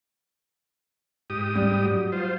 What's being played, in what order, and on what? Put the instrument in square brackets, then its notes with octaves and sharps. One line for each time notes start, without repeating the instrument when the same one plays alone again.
[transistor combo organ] G#2 G4 D#6
[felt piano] G3
F#3
[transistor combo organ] F4 C5